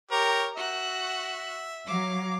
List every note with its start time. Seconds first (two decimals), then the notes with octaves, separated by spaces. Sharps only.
0.11 G4 A#4 C#5
0.57 F#4 E5 F#6
1.87 F#3 F5 D6